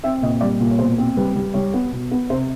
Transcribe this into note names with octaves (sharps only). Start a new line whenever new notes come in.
C4 E5
A#2 D#5
G3 D5
A#2
C#5
B2 C5
C4
G3 B4
G3
G3 C#5
B3
B2
B3
C3 C5